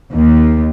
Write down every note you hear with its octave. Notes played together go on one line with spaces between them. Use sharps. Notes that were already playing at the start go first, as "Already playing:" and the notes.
D#2